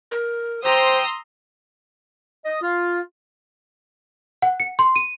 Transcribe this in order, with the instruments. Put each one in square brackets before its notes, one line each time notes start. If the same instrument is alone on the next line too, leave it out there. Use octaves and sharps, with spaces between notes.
[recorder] A#4
[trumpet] C5 [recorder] G5 [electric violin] A#5 E6 [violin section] C6 D#6
[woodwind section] D#5
F4
[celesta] F#5
C#7
C6
D#7